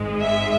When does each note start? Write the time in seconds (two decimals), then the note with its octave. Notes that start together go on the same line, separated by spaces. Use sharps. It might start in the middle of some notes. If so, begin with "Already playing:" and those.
Already playing: G#1 G#2 G#3
0.22 E5